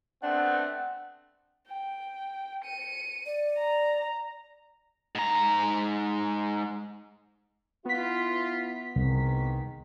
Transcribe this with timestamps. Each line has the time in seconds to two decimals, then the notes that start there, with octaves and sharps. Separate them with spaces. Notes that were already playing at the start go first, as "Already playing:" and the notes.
0.23 A3 B3 C4 D4 F#5
1.68 G5
2.65 C#7 D#7
3.26 D5
3.57 A#5
5.15 G#2 A#5
7.85 B3 E4 F4 B6
8.96 C2 G#2 D#3